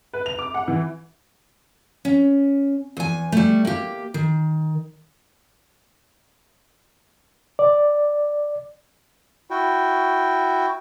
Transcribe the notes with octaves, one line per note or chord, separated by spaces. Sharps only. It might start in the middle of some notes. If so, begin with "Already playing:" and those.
B4
F7
D6
F#5
E3
C#4
E2 G#5
G3 A3
A#3 G4
D#3
D5
E4 F#4 G5